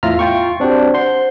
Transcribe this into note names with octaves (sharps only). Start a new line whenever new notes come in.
E2 A2 F4 E5 A#5 F6
F4 G5 C#6
C4 D4 F#4 G4 C5
C5 F#5 C6